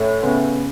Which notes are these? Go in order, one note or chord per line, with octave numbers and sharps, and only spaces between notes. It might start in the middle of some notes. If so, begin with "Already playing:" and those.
Already playing: A2 A3 C#4
C#3 B3